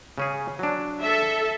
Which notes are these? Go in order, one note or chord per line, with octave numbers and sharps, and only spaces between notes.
C#3 C#4 G#4
F#3 D4
A4 E5